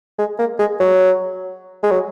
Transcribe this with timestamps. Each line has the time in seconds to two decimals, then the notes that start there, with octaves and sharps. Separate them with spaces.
0.18 G#3
0.39 A#3
0.59 G#3
0.80 F#3
1.83 G#3
1.91 F#3